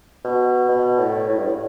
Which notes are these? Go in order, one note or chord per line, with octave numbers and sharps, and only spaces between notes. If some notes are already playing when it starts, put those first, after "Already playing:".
B2
B2
A2
A2
G2
A2